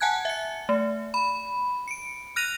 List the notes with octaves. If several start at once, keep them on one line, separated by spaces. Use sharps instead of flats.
F#5 G#5 A5 F#6 G#6
E5 C#7
A3
B5
C#7 D7
F6 F#6 A#6 D#7 F7